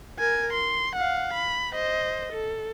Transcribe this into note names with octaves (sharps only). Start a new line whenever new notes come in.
A#4 G#5
C6
F5 F#5
B5
C5 D#5
A4